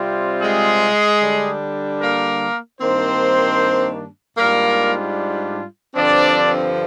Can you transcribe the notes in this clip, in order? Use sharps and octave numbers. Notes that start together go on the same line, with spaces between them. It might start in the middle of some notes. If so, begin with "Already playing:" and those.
Already playing: C3 G3 C4 F4
G#3 G#4
D3 G3 D4
A#3 A#4
G2 D#3 A#3 C4 D4 C5
G#2 G3 A#3 D4 F4 A#4
G2 D3 F3 C4 D4 D5